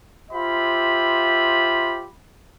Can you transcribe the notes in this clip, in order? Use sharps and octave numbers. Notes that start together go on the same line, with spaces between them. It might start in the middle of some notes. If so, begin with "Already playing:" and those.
F4 G4 C5 E5 B5